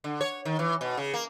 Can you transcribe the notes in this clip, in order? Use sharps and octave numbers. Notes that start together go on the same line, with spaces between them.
D3
C#5
D#3
E3
B2
C#3
A#3